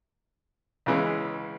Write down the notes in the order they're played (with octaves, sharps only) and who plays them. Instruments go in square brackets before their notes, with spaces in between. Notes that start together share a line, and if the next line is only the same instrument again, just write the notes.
[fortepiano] C#2 C#3 E3 G#3